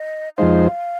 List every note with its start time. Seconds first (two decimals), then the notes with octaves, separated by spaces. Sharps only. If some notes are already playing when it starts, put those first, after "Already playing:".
Already playing: D#5
0.37 F2 F3 G#3 D#4 C5 F5